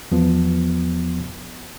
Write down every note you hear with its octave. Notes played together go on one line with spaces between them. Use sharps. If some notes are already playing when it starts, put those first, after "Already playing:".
E2 F3 B3